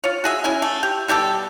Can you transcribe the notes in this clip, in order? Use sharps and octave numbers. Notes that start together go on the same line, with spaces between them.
F4 C#5
F#4 G#4 E5
C#4 E4 G#5
A3
G4
B2 G3 G4 A4